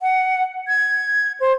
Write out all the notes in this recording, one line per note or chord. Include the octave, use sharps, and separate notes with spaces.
F#5
G#6
C5